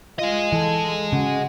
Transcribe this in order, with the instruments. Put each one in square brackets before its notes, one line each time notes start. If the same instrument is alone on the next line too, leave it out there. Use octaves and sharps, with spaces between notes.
[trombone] F4 [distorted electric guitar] G#4 D#5
[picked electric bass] E3 [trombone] A4
[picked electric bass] C#3 [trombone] F#4